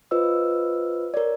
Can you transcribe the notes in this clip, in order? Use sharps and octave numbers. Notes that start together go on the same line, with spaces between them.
F4 B4 C5 D#5 E6
A#4 C#5 D5